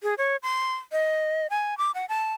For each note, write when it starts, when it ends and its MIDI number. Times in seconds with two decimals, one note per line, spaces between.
0.03 0.14 68
0.18 0.36 73
0.43 0.74 84
0.92 1.47 75
1.50 1.77 80
1.78 1.91 86
1.95 2.06 78
2.09 2.34 81